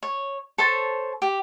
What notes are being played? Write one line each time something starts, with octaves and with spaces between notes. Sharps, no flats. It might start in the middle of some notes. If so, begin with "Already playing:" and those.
C#5
A4 C5 C#5 A5
G4